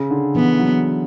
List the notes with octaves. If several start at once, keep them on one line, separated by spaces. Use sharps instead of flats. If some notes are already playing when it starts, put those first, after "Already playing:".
Already playing: C#3
D3
E3 B3
F#3